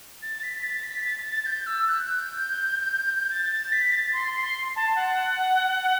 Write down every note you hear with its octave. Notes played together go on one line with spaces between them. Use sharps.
A6
B6
A6
B6
A6
A6
G6
E6
F#6
G6
A6
A6
B6
A6
C6
C6
A5
F#5